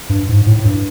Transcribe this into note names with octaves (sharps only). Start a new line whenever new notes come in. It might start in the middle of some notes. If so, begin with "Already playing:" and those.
G2
G#2
A2
G2